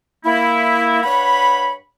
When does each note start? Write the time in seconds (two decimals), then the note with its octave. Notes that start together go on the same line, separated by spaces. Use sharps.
0.24 A#3 E4
1.03 G2 C#5 F#5 B5